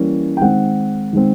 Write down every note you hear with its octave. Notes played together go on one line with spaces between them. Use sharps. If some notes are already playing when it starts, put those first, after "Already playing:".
Already playing: E3 G3 A#3 C#4
G5
D#3 G#3 C4 F#5
D#3 G#3 C4